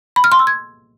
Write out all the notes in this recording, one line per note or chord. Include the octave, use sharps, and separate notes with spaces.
B5
F6
C6
E6
G#6